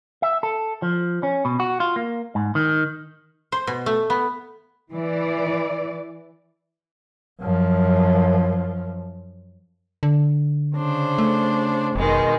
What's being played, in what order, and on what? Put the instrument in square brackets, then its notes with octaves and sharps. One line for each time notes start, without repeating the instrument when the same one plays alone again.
[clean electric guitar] E5
A4
F3
C#4
B2
F#4
F4
A#3
G#2
D#3
[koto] C5
B2
A3
B3
[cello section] E3 D5
[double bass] F#2 F3
[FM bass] D3
[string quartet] C#3 D4 C5
[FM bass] A3
[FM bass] F1 [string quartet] B2 D#3 G#3